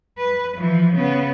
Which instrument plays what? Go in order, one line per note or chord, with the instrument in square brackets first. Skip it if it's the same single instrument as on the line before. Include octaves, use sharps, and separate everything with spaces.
[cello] B4
E3 F3
C#3 B3